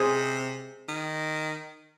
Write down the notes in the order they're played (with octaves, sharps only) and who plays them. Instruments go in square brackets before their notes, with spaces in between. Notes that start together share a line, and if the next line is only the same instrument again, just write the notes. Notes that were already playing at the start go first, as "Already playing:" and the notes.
Already playing: [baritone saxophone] C3 [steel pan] G#4 C5
[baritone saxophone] D#3